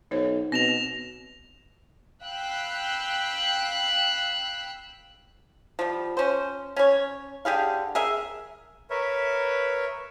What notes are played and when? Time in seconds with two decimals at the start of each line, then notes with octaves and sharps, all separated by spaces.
0.11 B1 D#4 C5 C#5
0.52 B2 C4 A#6 E7 F7
2.23 F5 G5 B5 E6 F#6
5.79 F3 G3
6.17 C#4 C5
6.76 C#4 C#5
7.45 D3 G4 G#4 F5
7.95 G#4 A#4 E5
8.90 A#4 B4 C#5 E5